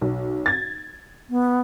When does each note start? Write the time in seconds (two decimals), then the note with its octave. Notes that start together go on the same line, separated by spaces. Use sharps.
0.01 B1
0.46 G#6 A6
1.30 B3